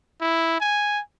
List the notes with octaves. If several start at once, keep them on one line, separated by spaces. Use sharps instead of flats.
E4
G#5